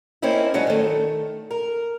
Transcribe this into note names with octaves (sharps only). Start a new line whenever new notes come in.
A#3 C4 C#4 D#4 E4
F#3 G#3 C#4 D4 F#4
D#3 A3
A#4